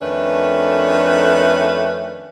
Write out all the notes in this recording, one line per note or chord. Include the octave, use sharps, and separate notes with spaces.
F2 D#3 A3 C#4 D4 B4